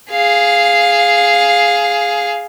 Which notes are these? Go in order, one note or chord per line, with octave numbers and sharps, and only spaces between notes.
G#4 F5